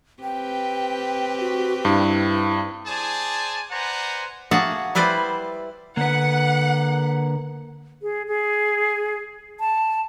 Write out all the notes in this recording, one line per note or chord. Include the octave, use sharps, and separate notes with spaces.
C4 G4 B4 G5
F#4
G2 E4
G#4 C5 D5 G#5 A5
B4 C5 D5 F#5 G#5 A#5
A#3 F#4 G#4 E5 F#5 A5
G3 E4 B4 C5 D5
D3 A#3 B4 F#5
G#4
G#4
A5